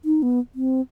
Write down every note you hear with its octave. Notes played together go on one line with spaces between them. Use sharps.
D#4
B3
C4